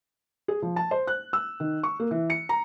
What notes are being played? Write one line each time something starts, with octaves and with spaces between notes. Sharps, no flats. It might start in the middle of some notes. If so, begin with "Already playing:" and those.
G#4
F3
A5
C5
F#6
E6
D#3
C#6
A#3
E3
C#7
A#5